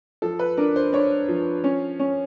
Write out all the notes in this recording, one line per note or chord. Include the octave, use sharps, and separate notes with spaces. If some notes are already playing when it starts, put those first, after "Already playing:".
F3 A4
B4
D4 A#4
C5
D4 C#5
F3
C#4
C#4